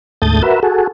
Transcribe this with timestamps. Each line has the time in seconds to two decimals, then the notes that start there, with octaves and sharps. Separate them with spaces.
0.22 D2 G#2 A3 D#6 G6 A6
0.42 F#4 A#4 B4 E5
0.63 F#4 G#4 A4